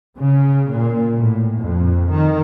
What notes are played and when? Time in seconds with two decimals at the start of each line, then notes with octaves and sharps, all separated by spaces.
0.17 C#3
0.70 A#2
1.17 A2
1.58 F2
2.10 D#3